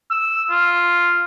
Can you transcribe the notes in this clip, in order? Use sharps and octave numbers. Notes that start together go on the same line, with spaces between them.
E6
F4